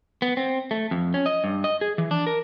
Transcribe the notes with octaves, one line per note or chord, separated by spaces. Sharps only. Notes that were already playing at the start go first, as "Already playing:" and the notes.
B3
C4
A3
F2
C#4
D#5
G2
D#5
G#4
E3
D4
A#4